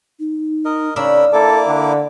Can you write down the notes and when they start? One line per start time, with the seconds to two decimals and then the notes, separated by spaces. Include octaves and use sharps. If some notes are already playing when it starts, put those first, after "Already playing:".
0.20 D#4
0.65 A#4 D#5
0.96 C#3 D4 A#4 B5 E6
1.33 A#3 E4 A4 D5 D6
1.67 D3